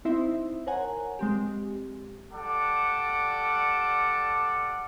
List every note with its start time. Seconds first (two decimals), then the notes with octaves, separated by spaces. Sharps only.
0.05 C4 D#4 E4 C5 E5
0.66 A#4 C5 C#5 F#5 G#5 A#5
1.19 G#3 C4 G4
2.33 G3 A4 D5 F#5 A5 D6